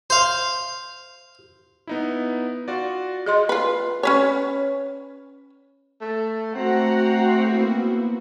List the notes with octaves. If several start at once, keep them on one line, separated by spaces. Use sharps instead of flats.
C5 F5
B3 D#4 E4
F4 F#4 D5
G#4 D#5 C6
F4 B4
C#4 B4 C#5
A3
A3 C4 F#4 F#5 A#5
A#3 B3 E4